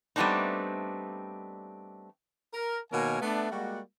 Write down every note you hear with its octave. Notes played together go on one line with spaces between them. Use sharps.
G3 A3 B3 C4 D4 D#4
A#4
B2 D#3 A#3 A#4 C#5 G#5
A3 B3 D4
G3 G#3 A#3 F#4